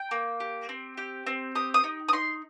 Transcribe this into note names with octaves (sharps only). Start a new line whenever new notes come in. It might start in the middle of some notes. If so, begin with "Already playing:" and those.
Already playing: G5
A#3
G4
C4
G4
C4
G4 D#6
D#6
D#4
D#6
D#4 C6